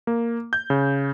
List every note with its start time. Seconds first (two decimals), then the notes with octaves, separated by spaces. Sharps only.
0.07 A#3
0.53 G6
0.70 C#3